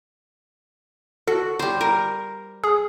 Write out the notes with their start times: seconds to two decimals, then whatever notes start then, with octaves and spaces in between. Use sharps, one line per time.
1.27 F#4 A4
1.59 G3 C5
1.81 A#4
2.64 G#4